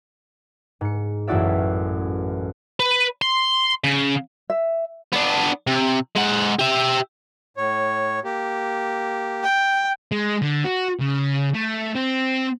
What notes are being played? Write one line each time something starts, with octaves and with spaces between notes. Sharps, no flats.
G#2 C#7
A1 F#2 E4 F#4 D5 E5
B4
C6
C#3
E5
B3 D4
C3
G#3 F#5
G4 E5
A2 C#5
A#3 G4
G5
G#3
D3
F#4
C#3
A3
C4